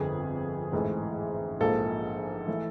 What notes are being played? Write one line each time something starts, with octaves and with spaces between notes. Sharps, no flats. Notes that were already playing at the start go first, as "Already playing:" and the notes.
Already playing: G1 F2 D3 G#4
A1 G#2 E3 A3
A#1 G#2 F3 A#3 A4
E3 A3